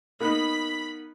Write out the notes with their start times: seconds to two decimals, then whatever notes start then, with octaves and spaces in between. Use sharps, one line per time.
0.20 A#3 B3 D#4 B5